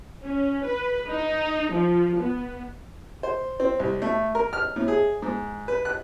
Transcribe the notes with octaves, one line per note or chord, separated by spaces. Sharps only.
C#4
B4
D#4
F3
B3
C5
C4
C2
A3
A#4
F6
A2
G#4
G#2
B4
F#6